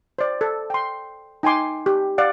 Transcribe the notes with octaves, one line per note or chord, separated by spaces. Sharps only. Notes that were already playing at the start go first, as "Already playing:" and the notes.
C5 D5
A4
G5 C6
D#4 G5 G#5 C6 D6
G4
D5 F5 F#5